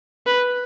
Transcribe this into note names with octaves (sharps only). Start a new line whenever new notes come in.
B4